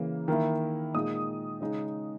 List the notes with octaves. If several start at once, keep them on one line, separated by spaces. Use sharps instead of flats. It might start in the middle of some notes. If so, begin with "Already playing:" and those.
Already playing: C#3 E3 A#3
D#3 A#3 E4
A#2 G#3 D#4 D#6
C#3 G#3 D#4